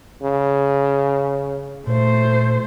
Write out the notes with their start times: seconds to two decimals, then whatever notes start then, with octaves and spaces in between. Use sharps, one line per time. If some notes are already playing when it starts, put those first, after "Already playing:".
0.22 C#3
1.87 A#2 A3 C5